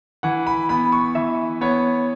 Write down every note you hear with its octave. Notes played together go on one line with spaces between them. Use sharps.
E3 F#5
B5
B3 B5
C#6
E3 E5
B3 C#5